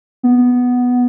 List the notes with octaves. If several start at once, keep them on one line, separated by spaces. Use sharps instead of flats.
B3